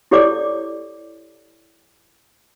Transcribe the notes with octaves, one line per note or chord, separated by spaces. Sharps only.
E4 G4 A4 C#5 D5 D6